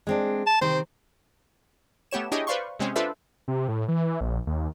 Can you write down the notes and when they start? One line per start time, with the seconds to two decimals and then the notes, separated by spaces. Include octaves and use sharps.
0.07 G#3 C4 D4
0.47 A5
0.61 C3 D#3 C4 C5
2.11 A3 B3 G4 C#5 E7
2.32 D4 E4 G4 G#4 C#5 D#5
2.47 B4 C5 D5 F5 C6 C#6
2.79 C3 G#3 C4 C#4
2.96 D4 F4 A4 B4 C5 E5
3.48 C3
3.68 A2
3.88 E3
4.21 A#1
4.47 D#2